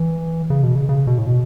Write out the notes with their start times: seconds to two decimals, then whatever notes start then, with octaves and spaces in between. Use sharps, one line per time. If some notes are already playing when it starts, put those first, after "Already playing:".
Already playing: E3
0.50 C#3
0.63 B2
0.75 C#3
0.89 C#3
1.07 B2
1.18 A2
1.27 B2